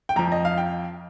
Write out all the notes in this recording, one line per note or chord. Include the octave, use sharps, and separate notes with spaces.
G5
F2 F3 A#5
D#5
F5
G5